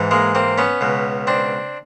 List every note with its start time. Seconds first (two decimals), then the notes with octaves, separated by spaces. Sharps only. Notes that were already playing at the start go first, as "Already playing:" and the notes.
Already playing: G#2 E3
0.11 G#3 A#3
0.35 A#3 C4
0.58 B3 C#4
0.81 C#2 B2
1.27 C4 D4